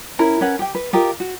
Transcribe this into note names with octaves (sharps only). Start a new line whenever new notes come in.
C#4 E4 A#4 B5
C#4 A#4 B4 F#5
G4 G5
B4
F4 G4 A#4 D#5
F#4